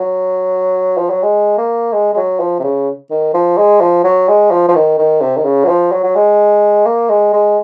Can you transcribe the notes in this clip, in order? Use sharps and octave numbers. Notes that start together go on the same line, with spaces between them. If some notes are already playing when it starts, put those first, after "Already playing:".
Already playing: F#3
F3
F#3
G#3
A#3
G#3
G#3
F#3
F3
C3
C#3
D#3
F3
G#3
F3
F#3
G#3
F3
F3
D#3
D#3
C3
D#3
C#3
F#3
F3
F#3
F#3
G#3
A#3
G#3
G#3